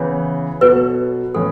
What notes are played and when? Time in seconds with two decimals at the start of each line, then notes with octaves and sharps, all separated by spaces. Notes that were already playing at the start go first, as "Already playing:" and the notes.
Already playing: C#3 E3 B3 C#5
0.61 B2 F#3 B3 F#4 A4 B4
1.35 A2 E3 C#4 A4